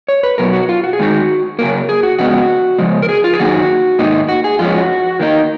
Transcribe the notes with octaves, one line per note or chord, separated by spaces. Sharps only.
C#5
B4
B2 F#3 B3 A#4
F#4
F4
F#4
G#4
D#3 G#3 D#4 F#4
C#3 F#3 A#3 A#4
G#4
F#4
F2 C#3 G#3 B3 F#4
C#3 F3 G#3
A#4
G#4
F4
G#4
F#2 D#3 A#3 D#4 F#4
G#2 D#3 A#3 D#4
F#4
G#4
F2 F3 G#3 C#4 F4
F#4
D#3 A#3 D#4